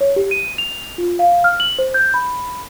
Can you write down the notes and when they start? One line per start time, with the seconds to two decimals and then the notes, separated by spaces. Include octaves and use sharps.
0.01 C#5
0.16 G4
0.31 D#7
0.58 F7
0.98 F4
1.19 F5
1.44 F6
1.60 F#7
1.79 C5
1.94 G6
2.14 B5